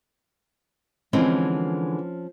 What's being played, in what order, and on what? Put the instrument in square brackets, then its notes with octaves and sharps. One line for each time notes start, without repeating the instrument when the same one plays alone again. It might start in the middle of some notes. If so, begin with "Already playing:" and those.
[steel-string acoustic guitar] D3 E3 G#3 [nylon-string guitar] F3 C4 C#4